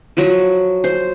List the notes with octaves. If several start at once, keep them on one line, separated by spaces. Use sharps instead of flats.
F3 F#3
C5